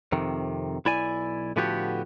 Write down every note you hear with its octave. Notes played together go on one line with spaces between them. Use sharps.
F2 C3 D#3
B1 E4 D5 G#5
A2 D3 F3 B3 F#4 G4